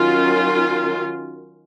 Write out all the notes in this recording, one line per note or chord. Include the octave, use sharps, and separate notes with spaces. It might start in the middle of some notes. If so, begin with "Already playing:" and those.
Already playing: D#3 F#3 C#4 F4